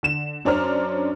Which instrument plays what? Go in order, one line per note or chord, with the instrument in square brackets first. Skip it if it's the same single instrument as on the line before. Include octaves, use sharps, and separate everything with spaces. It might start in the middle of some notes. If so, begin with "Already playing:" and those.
[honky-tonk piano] D3 E7
F#2 C#4 D4 C5 A#5 F6